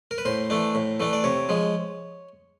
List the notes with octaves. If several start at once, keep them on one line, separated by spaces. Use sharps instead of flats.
A#4
B4
A2 C5
E3 A3 D4
A2
E3 A3 D4
D5
C3 C#5
F3 G#3